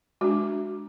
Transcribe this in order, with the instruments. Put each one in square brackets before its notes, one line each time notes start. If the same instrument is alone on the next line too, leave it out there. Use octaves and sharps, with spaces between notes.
[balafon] G#3 D4 F#4